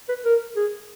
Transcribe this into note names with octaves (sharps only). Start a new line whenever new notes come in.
B4
A#4
G#4